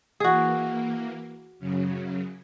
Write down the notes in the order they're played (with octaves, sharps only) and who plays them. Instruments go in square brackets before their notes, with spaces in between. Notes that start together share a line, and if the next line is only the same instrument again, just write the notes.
[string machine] E3 A#3 [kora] F#4 G#4
[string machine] F#2 C#3 F#3